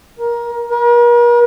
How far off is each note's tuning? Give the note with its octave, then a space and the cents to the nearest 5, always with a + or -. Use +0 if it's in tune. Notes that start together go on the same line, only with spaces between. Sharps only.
A#4 +20
A#4 +45